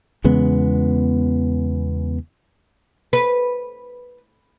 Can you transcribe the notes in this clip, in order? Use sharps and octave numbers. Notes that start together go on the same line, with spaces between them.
E2 C#3 G#3 B3
B4